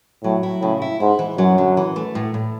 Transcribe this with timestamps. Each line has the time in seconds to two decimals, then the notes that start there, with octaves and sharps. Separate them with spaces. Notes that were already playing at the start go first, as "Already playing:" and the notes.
0.24 A2 F#3
0.43 E4
0.62 A2 C#3
0.82 E4
1.00 G#2 E4
1.19 E3
1.38 F#2 F#3
1.58 D3
1.77 E3
1.96 A3
2.15 A2
2.34 A2